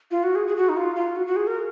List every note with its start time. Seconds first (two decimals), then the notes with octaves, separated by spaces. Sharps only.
0.11 F4
0.23 F#4
0.35 G#4
0.47 G#4
0.56 F#4
0.69 D#4
0.77 F4
0.96 F4
1.16 F#4
1.27 F#4
1.36 G#4
1.47 A#4